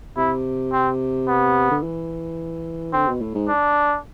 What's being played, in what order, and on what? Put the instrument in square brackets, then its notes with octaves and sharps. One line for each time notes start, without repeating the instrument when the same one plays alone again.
[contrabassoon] C3 [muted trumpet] E4
[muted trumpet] C4
B3
[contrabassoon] D3
E3
[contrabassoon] D3 [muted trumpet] C4
[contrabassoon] B2
A2
G#2
[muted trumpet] D4